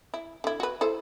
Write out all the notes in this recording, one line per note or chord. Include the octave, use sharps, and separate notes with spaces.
E4
D3 E4
F#4 B4
E4 A4 C5